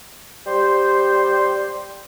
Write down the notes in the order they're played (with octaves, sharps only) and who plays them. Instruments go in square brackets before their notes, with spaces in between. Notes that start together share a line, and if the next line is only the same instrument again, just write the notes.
[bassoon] G3 [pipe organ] C5